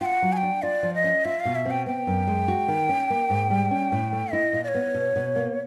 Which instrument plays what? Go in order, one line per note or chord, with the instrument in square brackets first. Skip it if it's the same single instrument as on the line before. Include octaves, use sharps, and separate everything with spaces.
[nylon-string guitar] F4 [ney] G5
[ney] F#5
[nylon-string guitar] F#3
[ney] G#5
G5
[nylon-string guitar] D4
[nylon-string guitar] F4 [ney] D5
[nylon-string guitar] F3
[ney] D#5
[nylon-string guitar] C#4
[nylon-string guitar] F4 [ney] E5
[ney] F5
[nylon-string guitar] B2
[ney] E5
[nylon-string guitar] C4 [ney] G5
[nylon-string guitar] B3 [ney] G5
[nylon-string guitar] F#2
G#3
F#4
D#3
C#4
A#3
G#2
G3
C#4
A2
A3
[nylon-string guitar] E4 [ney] D#5
[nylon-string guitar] A#2
[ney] D5
C#5
[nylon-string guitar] B3
B2
B2
A#3